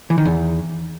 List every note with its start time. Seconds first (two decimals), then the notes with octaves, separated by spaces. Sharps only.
0.10 E3
0.18 D#3
0.25 E2